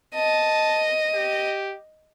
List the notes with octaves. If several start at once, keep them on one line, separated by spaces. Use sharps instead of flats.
D#5 A5
G4